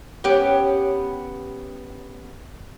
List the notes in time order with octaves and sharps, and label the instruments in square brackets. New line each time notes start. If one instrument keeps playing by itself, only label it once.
[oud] B3 C#4 G4